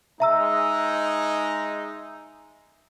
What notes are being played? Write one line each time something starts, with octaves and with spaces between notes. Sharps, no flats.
G#3 D#4 E5 A#5 E6